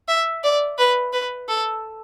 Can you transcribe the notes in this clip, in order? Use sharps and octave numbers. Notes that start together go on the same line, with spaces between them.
E5
D5
B4
B4
A4